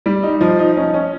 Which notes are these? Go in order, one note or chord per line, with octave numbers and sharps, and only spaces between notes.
G3
D#4
F3
D#4
C#4
C#4